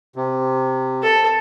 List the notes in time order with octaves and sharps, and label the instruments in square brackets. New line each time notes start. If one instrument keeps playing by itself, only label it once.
[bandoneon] C3
[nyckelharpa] A4